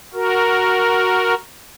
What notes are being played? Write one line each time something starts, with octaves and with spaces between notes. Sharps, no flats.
F#4 A#4